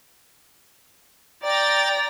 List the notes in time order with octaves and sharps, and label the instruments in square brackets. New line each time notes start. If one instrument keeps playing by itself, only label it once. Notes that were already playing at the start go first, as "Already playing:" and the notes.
[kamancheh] D5 [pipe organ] G5 A#5 A6